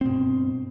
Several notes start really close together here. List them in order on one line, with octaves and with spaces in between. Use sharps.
C4 B2 G2